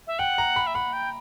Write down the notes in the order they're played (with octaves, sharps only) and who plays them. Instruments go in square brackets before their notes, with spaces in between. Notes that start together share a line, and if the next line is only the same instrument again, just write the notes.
[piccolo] E5
[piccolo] F#5 [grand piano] G5
[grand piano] A#5
B5
[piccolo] E5
[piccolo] F#5 [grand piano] B5
[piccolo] G5